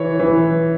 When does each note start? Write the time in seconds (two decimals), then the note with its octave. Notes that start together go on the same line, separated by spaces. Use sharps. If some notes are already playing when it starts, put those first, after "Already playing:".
Already playing: E3 C#5
0.20 E3